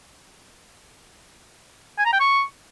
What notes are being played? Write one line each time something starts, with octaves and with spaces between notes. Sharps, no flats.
G#5
A#5
G5
C#6